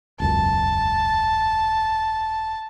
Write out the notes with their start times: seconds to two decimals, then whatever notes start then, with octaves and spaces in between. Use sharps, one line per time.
0.20 E1 C#2 F#2 A5